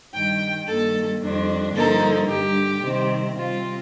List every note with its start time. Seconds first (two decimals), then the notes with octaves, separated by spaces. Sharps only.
0.14 G2 D#3 G3 G5
0.68 G2 D#3 A#3 A4
1.22 F2 D#3 G3 D4
1.75 G2 D3 F3 A#3 D#4 A4
2.29 G2 D3 G3 G4
2.83 C3 D#3 G3 C4
3.37 C3 G3 C4 F4